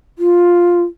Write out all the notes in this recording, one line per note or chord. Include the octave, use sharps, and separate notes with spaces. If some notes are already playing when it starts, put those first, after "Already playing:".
F4